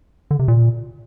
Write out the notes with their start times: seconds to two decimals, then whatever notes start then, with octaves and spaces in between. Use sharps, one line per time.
0.31 D3
0.39 C3
0.48 A#2